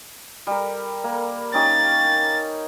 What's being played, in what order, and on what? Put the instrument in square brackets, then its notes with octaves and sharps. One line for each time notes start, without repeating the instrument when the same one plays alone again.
[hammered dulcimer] G3 A#4
A#3
[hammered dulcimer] C#4 D#4 G4 [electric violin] A6